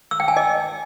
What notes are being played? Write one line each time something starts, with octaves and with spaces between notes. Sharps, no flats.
E6
G5
G#5
D#5